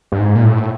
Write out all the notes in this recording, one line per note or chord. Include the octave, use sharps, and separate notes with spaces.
G2
G#2
A#2
A2